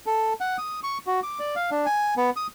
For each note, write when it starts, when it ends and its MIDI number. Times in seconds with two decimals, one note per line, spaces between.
0.06 0.33 69
0.41 0.57 78
0.58 0.80 87
0.83 0.98 85
1.07 1.20 66
1.23 1.39 86
1.39 1.55 74
1.56 1.70 77
1.71 1.86 62
1.86 2.14 80
2.17 2.30 59
2.36 2.47 87